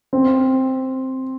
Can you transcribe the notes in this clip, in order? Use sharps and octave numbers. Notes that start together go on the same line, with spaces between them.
C4